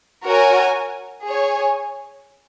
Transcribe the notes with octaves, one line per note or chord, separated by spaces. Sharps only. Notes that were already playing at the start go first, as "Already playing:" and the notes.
F#4 A#4 C#5 G#5
G#4 C#5 G#5